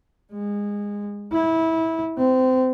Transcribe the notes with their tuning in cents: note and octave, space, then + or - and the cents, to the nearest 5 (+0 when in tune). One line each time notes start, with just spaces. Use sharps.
G#3 -20
E4 -20
C4 -25